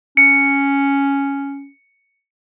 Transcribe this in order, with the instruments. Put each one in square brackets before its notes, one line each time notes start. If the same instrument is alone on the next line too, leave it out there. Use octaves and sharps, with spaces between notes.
[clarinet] C#4 [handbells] C#7